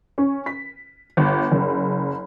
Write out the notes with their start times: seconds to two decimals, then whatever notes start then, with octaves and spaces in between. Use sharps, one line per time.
0.18 C#4
0.46 B6
1.17 G1
1.51 F#1